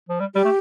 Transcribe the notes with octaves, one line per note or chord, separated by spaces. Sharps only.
F3
G3
G3 G4
A3